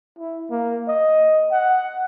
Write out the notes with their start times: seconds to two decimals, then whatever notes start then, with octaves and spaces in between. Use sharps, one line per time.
0.19 E4
0.51 A#3
0.88 D#5
1.52 F#5